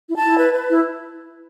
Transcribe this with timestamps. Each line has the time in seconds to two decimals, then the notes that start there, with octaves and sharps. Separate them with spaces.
0.09 E4
0.17 A5
0.24 E4
0.39 B4
0.53 B4
0.68 E4